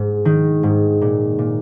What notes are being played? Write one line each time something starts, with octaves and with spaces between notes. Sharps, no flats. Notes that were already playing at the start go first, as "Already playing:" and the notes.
Already playing: G#2
D#3
G#2
A#2
A#2